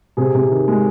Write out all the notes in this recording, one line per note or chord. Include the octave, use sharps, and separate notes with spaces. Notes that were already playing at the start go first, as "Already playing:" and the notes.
C3 G#4
C3
D#3
G#3